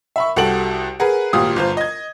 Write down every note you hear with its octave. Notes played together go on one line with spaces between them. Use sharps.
E5 B5 C#6
C2 F#4 G4 A4 D7 F#7
G#4 A#4 B4 F#5
G#1 A#2 G4 F5 D#6
G1 F4 C5
D#5 G#6